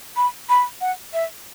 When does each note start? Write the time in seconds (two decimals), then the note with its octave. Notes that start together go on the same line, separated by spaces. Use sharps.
0.17 B5
0.49 B5
0.81 F#5
1.13 E5